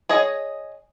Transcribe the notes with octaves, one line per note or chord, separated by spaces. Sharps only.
G#4 C#5 D#5